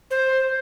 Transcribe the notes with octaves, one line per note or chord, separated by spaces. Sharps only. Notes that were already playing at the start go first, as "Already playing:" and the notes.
C5